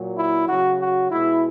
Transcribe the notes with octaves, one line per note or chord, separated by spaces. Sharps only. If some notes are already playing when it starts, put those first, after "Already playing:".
Already playing: A#2 F#3
E4
C#3 F#3 F#4
F#4
B2 G#3 E4